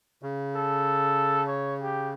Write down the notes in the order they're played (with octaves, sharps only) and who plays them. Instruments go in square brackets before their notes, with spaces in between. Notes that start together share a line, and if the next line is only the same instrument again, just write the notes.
[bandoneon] C#3
[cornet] A4
C#5
G4